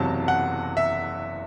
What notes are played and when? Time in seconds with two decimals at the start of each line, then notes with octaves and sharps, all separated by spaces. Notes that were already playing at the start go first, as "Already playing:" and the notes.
Already playing: F#1 E2 C3 F#3 A5
0.28 F#5
0.77 E5